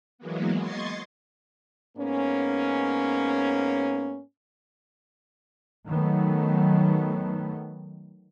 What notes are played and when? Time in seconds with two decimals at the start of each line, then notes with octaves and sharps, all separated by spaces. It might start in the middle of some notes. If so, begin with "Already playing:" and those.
0.18 E3 F#3 G#3 A#3 B3
0.60 D#5 C6 C#6 G#6 A6 C7
1.98 G#2 A#3 B3 C#4
5.87 D#3 F#3 A3 B3